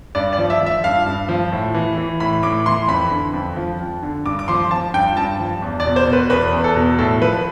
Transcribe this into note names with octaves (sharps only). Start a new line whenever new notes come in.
G2 D5
D5
F3
E5
F3
E5
G2 F5
G2
F3
A2
E3
E3
A2 B5
A2 D6
E3 C6
F2 B5
D3
F2
F3
F2
D3
G2 D6
D6
F3 C6
F3 A5
G2 G5
G2 A5
F3
E2
D5
B2
C5
B2
B4
E2 B4
E2
A4
B2
A2 A4
F3 B4